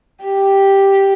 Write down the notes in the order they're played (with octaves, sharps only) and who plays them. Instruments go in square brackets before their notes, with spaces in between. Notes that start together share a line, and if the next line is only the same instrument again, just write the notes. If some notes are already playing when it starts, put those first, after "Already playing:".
[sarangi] G4